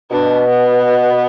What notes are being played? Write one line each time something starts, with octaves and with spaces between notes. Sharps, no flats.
B2 D4
B3